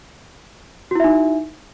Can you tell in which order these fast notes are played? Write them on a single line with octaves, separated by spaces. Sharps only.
F#4 E4 E5 D#4